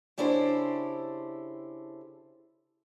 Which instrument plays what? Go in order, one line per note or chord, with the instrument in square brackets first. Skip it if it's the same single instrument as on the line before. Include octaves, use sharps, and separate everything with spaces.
[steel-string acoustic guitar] C#3 D4 E4 G4 A4 C5